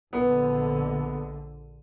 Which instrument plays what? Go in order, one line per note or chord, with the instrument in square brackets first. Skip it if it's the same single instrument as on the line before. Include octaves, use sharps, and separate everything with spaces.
[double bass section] A#1 D3 [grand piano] B3